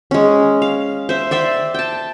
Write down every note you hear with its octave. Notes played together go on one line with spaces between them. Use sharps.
G#3 C#4
F5
C5 E5
D5 E5 G5 C6
G5 A5